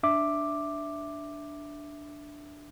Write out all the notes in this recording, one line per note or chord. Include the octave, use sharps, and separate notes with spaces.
D4 E5 D6